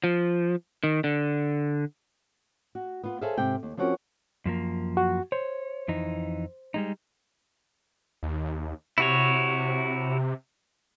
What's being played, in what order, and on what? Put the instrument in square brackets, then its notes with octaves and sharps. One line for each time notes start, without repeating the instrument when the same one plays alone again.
[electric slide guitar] F3
D#3
D3
[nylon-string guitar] F#4
B3 F4
G#4 A4 C5 C#5 E5 F5
G#2 C3 G5
D#2
F3 C4 C#4 F#4 G4 A#4
[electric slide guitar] F#2 F3 A#3
[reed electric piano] F#4
[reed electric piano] C5 [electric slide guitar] C#5
[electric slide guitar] F2 E3 D#4
G3 G#3 D#4
[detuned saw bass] D#2
[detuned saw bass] C3 [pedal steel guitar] E4 F#4 C#5